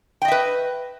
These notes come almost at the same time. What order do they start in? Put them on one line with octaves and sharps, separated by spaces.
G5 D#5 E5 B4